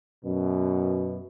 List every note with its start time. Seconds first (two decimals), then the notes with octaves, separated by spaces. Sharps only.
0.24 F#2 B2